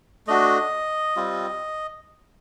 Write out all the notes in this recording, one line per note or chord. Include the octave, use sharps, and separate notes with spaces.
A3 D4 F#4 D#5
G3 C4 F4